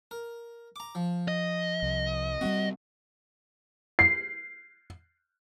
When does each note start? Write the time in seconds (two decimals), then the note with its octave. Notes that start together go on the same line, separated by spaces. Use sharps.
0.11 A#4
0.76 A#5 D6
0.95 F3
1.28 D#5
1.82 C2
2.41 G3 G#3 C4 F#4
3.99 C7